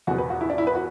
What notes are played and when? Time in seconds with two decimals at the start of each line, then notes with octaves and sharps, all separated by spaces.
0.07 E2 B2 F#4
0.18 B4
0.30 F#4
0.41 E4
0.50 D4
0.58 E4
0.67 B4
0.75 F#4